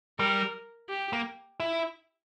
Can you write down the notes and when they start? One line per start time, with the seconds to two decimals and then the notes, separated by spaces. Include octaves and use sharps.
0.19 G3 A#4
0.89 G4
1.13 A#3
1.60 E4